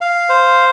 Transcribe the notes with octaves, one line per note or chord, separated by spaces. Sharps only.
F5
C5